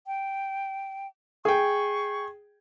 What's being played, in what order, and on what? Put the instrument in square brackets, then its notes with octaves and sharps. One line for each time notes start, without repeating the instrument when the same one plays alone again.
[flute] G5
[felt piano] G#4 G5 [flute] C#6